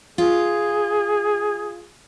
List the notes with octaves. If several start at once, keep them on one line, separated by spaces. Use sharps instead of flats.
F4 G#4